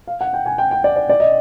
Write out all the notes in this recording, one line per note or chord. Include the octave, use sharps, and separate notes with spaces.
F5
F#5
G5
G#5
G5
G5
D5
D5
D5
D#5